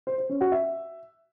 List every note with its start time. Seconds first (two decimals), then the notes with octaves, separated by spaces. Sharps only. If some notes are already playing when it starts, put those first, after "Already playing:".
0.07 C5
0.18 C5
0.29 C#4
0.41 F#4
0.52 E5